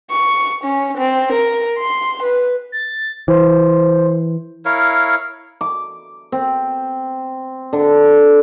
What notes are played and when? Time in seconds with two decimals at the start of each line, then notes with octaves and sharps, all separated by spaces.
0.11 C#6
0.64 C#4
0.97 C4
1.32 A#4
1.78 C6
2.23 B4
2.72 A6
3.28 E3 C5
4.65 E4 A#4 C#5 F5
5.61 D6
6.32 C4
7.73 D3